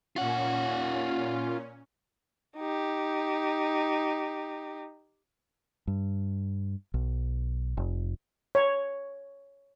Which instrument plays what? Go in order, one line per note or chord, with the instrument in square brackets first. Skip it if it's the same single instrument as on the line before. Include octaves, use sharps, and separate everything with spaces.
[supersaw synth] A#2 C#4 [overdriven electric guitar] F4 F#5
[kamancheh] D#4 G4
[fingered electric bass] G2
B1
F1
[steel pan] C#5